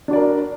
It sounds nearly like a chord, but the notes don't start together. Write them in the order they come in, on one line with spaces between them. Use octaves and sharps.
D4 F#4 D5 A#4